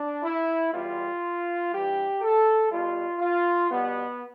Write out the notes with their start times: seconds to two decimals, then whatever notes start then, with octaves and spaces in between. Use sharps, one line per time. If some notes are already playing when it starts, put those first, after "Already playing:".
Already playing: D4
0.23 E4
0.72 E2 B2 G3 F4
1.71 G2 E3 G3 G4
2.21 A4
2.70 B2 G3 F4
3.20 F4
3.69 B2 G3 B3